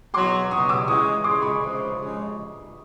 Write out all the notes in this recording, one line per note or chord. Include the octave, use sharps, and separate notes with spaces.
E2 B2 F#3 C6 D6
E2 B2 F#3 C#6 D#6
D6 E6
C#3 E3 G#3 C#6 D#6
C#3 E3 G#3 C6 D6
B5 C#6
C#3 F3 G#3
C#3 F3 G#3